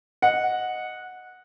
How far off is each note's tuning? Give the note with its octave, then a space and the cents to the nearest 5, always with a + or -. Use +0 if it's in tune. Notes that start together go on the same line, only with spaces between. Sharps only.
D#5 +0 F#5 -10